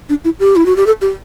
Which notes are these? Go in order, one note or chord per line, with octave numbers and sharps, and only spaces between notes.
D4
E4
G4
E4
F#4
G4
A4
G4